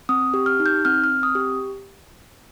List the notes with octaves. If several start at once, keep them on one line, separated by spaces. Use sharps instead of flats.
C4 D#6
G4
F6
D#4
G6
C4 F6
F6
C4
D#6
G4